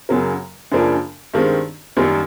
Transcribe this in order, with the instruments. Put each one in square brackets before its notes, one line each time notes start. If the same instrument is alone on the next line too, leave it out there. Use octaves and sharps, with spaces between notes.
[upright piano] F#2 C#3 F#3 A#3
F#2 C#3 F3 A#3 D4
G2 D#3 G#3 C4
F#2 D#3 G3 A#3